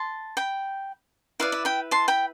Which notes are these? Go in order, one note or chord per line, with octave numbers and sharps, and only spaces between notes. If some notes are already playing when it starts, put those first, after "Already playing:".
Already playing: A5 C6
G5 B5
E4 B4 D5 F5
E5
G5 B5
A5 C6
G5 B5